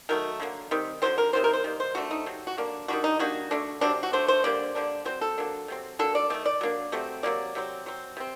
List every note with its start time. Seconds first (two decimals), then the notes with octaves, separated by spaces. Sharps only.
0.09 D#3 F#3 A3 A#4
0.40 D3 F#3 A#3
0.71 D#3 G3 C4
1.02 D3 F#3 A3 C4 C5
1.18 A#4
1.33 C3 D#3 F#3 C4 C5
1.44 A#4
1.53 C5
1.64 D#3 G3 A#3
1.80 C5
1.95 D3 A3 D4 F#4
2.11 D#4
2.26 C3 F#3 C4
2.47 F#4
2.58 D3 F#3 A#3 D4
2.88 D#3 G3 D4 F#4
3.04 D#4
3.19 D#3 G3 A#3 D4 F#4
3.51 D3 A3 D4
3.81 C3 F#3 C4 D4
4.03 F#4
4.13 F#3 A3 D4 C5
4.28 C5
4.44 D3 G3 A#3 D4 D5
4.75 D3 G3 A#3 D4
5.05 F#3 C4 C5
5.21 A4
5.38 F#3 A#3 D4
5.68 C3 F#3 C4
5.99 F#3 A#3 D4 A4
6.15 D5
6.30 D#3 A3 C4 D5
6.46 D5
6.61 F#3 A#3 D4
6.92 C3 F#3 A3 C4
7.23 C3 F#3 A#3 D5
7.55 C3 F#3 C4
7.86 F#3 C4
8.17 C3 G3 C4